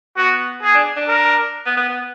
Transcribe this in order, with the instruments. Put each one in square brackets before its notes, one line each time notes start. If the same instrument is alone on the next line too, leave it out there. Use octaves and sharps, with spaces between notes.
[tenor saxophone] B3 [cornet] F#4
[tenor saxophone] B3 [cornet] G#4
[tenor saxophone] D4
D4
[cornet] A#4
[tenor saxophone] B3
B3
B3